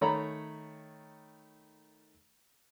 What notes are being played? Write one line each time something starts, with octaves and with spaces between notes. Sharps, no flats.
D#3 A3 C#5 A#5 B5